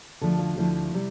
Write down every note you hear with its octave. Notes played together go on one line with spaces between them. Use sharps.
D2 D3 F3 A3 A4
F4
D2 D3 F3 A3 E4
C3 G3